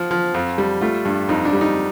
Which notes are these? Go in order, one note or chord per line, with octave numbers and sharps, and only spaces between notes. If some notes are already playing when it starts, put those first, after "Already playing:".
Already playing: F3
F3
F2
G3
A3 F4
G2
F2 D#4
D4
G3
D#4